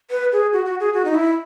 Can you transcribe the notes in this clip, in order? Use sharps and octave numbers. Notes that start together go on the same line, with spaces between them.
B4
G#4
F#4
F#4
G#4
F#4
D#4
E4